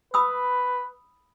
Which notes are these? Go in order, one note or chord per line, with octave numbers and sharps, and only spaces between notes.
B4 B5 D#6 E6